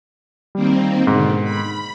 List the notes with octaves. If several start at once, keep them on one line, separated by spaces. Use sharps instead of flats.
D#3 G3 A#3 C4
G#2 B2 D3 D#3
B5